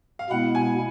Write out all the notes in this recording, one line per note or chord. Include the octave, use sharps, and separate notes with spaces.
F5
B2 G#3 B3 E4 F#5
G#5